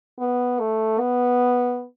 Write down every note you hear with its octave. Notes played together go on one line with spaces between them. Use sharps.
B3
A3
B3